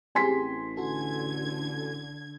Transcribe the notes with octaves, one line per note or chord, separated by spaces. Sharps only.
A1 C4 G4 G#4 G#5 C6 B6
D3 F#4 A4 G#6